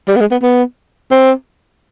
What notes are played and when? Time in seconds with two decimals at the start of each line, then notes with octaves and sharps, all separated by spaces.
0.08 G3
0.16 B3
0.21 G#3
0.32 B3
0.43 B3
1.11 C4